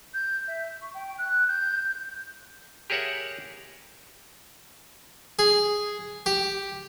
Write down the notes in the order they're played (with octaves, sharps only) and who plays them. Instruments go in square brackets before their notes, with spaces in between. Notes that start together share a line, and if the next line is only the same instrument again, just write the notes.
[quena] G6
E5
C#6
G5
F#6
G6
[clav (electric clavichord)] G4 G#4 A#4 C#5 E5 F#5
[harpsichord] G#4
G4